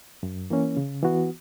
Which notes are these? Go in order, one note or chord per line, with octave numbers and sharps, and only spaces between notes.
F#2
E3 A#3 C#4
C#3
E3 B3 F#4